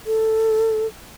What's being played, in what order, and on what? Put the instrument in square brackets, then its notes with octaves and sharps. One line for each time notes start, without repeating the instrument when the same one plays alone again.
[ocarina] A4